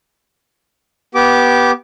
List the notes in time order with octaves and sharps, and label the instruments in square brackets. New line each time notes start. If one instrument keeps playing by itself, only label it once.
[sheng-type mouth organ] B3 G4 D6